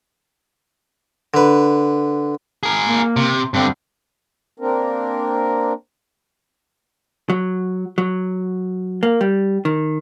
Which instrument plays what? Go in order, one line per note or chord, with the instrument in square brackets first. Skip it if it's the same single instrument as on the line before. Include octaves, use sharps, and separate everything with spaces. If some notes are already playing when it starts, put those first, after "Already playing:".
[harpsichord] D3 B4
[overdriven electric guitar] G#4 A#4
[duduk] A#3
[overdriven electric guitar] C3
[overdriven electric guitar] G2 D3 [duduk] C4
[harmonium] A#3 C4 D4 A#4
[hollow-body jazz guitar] F#3
F#3
A#3
G3
D#3